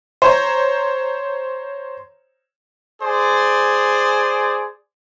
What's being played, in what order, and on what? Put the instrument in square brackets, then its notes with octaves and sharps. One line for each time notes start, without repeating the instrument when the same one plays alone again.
[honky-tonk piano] C5 C#5 A#5
[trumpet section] G#4 C5 D5